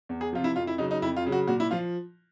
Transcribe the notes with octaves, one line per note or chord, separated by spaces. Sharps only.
E2
G#4
C3 F3 F4
E4
F2 F4
E4
C#3 F#3 D#4
D#4
F2 E4
F4
C#3 F#3
F#4
A#2 F#4
E4
F3 F4